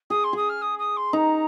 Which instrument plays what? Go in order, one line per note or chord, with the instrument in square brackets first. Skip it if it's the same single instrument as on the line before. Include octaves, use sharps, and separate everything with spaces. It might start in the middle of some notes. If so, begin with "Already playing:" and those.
[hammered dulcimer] G#4 [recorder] D#6
[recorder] C6
[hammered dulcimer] G#4 [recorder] D#6
[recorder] F6
D#6
D#6
C6
[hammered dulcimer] D#4 [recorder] A#5